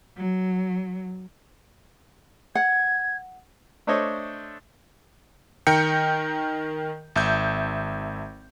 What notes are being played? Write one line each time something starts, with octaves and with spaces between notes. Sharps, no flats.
F#3
F#5 G#6
A3 D4 A4 C5 C#5 D#5
D#3 A#4 G5 G6 C#7
G#1 E5 G6